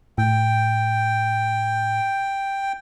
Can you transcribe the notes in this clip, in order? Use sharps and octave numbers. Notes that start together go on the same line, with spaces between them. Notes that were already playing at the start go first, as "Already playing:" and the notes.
A2 G5